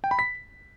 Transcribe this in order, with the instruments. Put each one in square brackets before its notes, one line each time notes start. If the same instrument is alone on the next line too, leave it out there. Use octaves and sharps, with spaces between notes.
[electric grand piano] G5
B5
B6